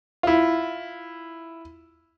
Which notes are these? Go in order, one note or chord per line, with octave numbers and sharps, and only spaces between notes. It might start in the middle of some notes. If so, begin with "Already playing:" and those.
E4 F4